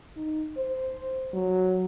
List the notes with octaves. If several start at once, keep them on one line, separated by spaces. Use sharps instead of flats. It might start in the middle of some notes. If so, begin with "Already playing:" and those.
D#4
C5
F#3